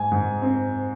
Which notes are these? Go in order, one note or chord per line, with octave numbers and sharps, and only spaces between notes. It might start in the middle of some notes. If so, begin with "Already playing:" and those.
Already playing: G#2 G#5
G#2
C4